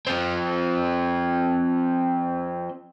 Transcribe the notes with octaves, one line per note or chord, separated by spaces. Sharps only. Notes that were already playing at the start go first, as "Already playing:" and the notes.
F3 C4